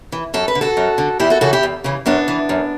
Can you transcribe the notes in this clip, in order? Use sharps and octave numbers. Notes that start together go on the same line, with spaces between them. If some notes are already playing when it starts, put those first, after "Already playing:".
E3
F#2 A4
B4
D3
F#4 A4
F#2
D3
E2 E4 G4
F#4 A4
C#3 E3 F#4 A4
E4 G4
E2
C#3 E3
F#2 B3 D4
E3
F#2